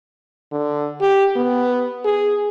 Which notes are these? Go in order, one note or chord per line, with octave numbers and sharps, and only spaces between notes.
D3
G4
B3
G#4